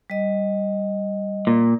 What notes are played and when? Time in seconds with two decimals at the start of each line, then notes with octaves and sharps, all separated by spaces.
0.10 G3 D#5
1.47 A#2